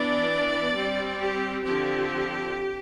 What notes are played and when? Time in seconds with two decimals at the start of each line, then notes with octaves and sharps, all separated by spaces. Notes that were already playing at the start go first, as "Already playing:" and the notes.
Already playing: E3 B3 D4 D5
0.74 G3 C4
1.19 G4
1.64 D3 F3 C4 G4